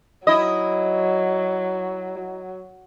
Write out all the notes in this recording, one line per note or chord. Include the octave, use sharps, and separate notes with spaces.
F#3 E4 D#5